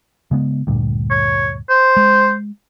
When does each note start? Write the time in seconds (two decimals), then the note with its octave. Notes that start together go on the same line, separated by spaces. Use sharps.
0.31 C#3 G#3 B3
0.67 D2 G2 A#2
1.10 C#5
1.70 C5
1.96 G#3